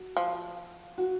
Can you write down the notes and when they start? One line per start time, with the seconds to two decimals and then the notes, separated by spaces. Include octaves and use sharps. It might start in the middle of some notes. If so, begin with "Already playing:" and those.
Already playing: F#4
0.17 F3
0.98 F#4